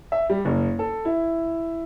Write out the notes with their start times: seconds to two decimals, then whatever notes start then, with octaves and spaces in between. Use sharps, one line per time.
0.12 E5
0.30 G3
0.45 F#1
0.79 A4
1.05 E4